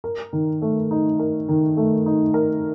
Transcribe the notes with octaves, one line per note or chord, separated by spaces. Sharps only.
A#4
D#3
A3
D#4
A#4
D#3
A3
D#4
A#4